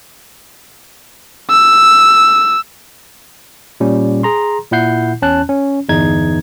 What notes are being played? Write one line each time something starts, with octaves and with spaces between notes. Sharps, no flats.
E6
A#2 G3 C#4
G#4 A#5 C6
A#2 E4 F#5 G6 C7
E2 C#4 A5 F#6
C#4
G1 E2 D#4 G#6